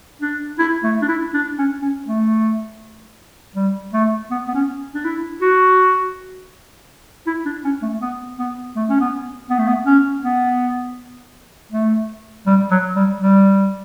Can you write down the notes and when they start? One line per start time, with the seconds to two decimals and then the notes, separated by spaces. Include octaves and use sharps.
0.22 D4
0.59 E4
0.83 A3
1.02 D4
1.08 E4
1.34 D4
1.58 C#4
1.82 C#4
2.08 A3
3.56 G3
3.93 A3
4.30 B3
4.48 B3
4.55 C#4
4.94 D4
5.05 E4
5.42 F#4
7.27 E4
7.45 D4
7.64 C#4
7.82 A3
8.01 B3
8.39 B3
8.76 A3
8.90 C#4
9.00 B3
9.50 B3
9.58 A3
9.67 B3
9.86 C#4
10.23 B3
11.72 A3
12.46 G3
12.71 F#3
12.96 G3
13.21 G3